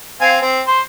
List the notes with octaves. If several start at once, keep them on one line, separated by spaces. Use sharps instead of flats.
C4 F5 G#5
C4
C5